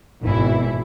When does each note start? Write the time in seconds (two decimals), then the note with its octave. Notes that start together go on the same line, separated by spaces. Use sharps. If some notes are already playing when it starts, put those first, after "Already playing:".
0.22 G#1 B2 E3 E4